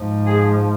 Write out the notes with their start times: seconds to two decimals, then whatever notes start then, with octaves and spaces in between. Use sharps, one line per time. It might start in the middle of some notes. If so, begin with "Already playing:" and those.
Already playing: G#2 F3
0.26 G#4